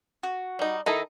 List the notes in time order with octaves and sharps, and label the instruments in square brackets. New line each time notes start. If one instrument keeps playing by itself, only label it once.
[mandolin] F#4
[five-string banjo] G3 D#4
[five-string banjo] D#3 E4 A4 [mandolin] D#4 D#5